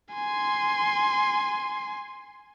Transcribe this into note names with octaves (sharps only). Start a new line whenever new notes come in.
G#5 C6